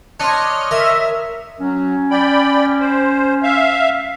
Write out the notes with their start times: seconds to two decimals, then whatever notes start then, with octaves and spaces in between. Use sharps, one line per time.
0.20 D4 C#5 D#5 C6 D6 F6 F#6
0.71 A#4 E5
1.60 F#3 C#4
2.11 D5 G5 B5
2.80 C5
3.43 E5 F5